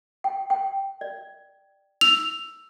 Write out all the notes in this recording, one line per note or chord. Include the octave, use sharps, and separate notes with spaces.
G5
G5
D5
E6 F7